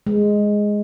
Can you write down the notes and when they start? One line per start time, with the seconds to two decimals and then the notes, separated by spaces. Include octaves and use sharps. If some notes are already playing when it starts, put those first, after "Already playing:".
0.07 G#3